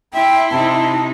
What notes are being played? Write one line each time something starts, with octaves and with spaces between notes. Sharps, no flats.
E4 E5 G5 C6
C3 D#4 A5